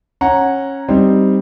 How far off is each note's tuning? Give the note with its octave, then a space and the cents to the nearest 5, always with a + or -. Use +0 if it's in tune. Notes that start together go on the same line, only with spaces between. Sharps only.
C#4 -15 F#5 -5 A#5 +0
G3 +0 C4 +0 D#4 +0